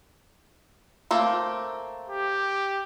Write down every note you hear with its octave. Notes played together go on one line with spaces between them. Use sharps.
A3 A#3 C4
G4